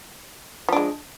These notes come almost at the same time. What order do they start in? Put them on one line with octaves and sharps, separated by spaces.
F3 D4 G#3